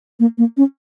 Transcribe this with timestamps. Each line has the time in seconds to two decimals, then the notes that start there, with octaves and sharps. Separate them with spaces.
0.20 A#3
0.38 A#3
0.57 C#4